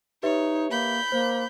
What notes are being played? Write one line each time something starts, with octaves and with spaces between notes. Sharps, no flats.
D#4 G4 B4 C#5 E5
A#3 B5 G6
A#3 C5